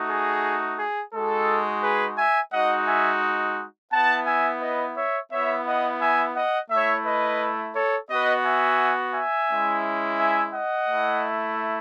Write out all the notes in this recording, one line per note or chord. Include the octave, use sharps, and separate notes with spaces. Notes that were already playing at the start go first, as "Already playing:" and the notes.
Already playing: A3 D#4 F#4
G#4
G#4
G#3 D#4 F#4 A4
G#4 B4
E5 G#5
G#3 D#4 F#4 D#5 F#5
E5 G#5
B3 E4 F#5 A5
E5 G#5
B4 D#5
C#5 E5
B3 E4 C#5 E5
D#5 F#5
E5 G#5
D#5 F#5
A3 E4 C#5 E5
B4 D#5
A4 C#5
B3 F#4 B4 D#5
E5 G#5
E5 G#5
G#3 C#4 E4
E5 G#5
D#5 F#5
A3 E4